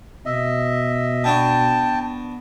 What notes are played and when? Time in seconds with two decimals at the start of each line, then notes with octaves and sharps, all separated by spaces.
0.26 B2 D#5 E5
1.24 B3 D4 F#4 G5 A5